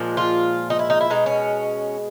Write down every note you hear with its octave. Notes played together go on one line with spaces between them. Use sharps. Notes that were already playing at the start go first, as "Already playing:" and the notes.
Already playing: A#2 F3 G#3
F4
D#4
E4
D#4
E4
B2 G#3 D#4
C#4